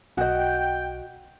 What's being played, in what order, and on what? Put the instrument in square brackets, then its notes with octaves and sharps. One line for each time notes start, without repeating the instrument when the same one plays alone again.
[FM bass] B1 [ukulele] F#4 D#5 [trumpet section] G5